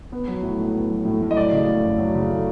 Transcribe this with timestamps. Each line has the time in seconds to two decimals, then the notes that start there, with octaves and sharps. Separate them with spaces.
0.12 B3
0.28 F#3
0.43 A2
0.59 A2
0.75 B3
0.90 F#3
1.05 A2
1.22 A2
1.31 D#5
1.37 F#3 D5
1.53 C#3
1.68 A3
1.84 F#2
1.98 F#3
2.15 C#3
2.30 A3